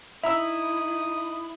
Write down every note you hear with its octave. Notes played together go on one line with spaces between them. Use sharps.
D#4 E4 E5 A#5 D#6 E6